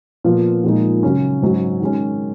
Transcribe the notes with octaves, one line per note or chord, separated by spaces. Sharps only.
A#2 F3 B3 F4
A#2 F3 G#3 D#4
C#3 F#3 C#4
G#2 F#3 C#4
D#3 G#3 C#4